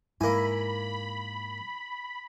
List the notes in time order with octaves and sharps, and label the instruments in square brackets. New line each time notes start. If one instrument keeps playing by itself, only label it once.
[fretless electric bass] G#2 [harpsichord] A#3 G#5 [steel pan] E4 [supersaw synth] B5